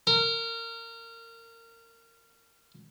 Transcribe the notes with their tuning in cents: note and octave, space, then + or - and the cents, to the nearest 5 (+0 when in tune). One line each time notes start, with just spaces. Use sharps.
A#4 -25